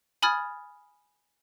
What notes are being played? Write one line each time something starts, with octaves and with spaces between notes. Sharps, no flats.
G#5 B5 D#6 F6 G#6 A6